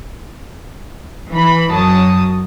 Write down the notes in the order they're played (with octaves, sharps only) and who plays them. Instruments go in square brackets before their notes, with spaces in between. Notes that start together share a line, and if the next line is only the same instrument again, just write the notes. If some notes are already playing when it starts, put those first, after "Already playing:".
[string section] E3 B5
F#2 F#3 A5 D#6